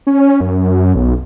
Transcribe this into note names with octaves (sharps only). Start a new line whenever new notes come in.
C#4
F#2
B1